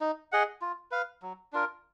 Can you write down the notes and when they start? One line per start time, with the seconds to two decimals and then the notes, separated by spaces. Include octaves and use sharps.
0.01 D#4
0.32 G#4 D#5 F#5
0.62 F4
0.91 B4 F5
1.22 F#3
1.53 D4 F4 A#4